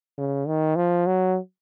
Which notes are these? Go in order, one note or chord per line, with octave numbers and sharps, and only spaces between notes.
C#3
D#3
F3
F#3